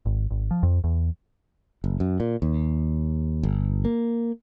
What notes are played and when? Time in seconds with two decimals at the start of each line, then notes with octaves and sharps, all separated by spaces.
0.06 G#1
0.31 G#1
0.51 F3
0.63 F2
0.84 E2
1.84 F#1
2.00 F#2
2.20 A#2
2.42 D#2
3.43 G1
3.85 A#3